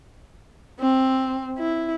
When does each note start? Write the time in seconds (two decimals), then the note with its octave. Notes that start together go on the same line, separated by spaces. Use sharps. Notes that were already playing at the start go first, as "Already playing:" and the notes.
0.80 C4
1.58 E4